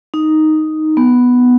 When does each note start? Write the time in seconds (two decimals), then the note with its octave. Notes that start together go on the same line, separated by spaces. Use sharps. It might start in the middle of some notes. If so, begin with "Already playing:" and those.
0.14 D#4
0.97 B3